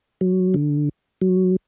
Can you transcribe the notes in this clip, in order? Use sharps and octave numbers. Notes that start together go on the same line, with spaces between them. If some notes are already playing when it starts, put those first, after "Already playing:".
F#3
D3
F#3